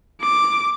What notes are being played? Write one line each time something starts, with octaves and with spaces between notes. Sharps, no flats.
D6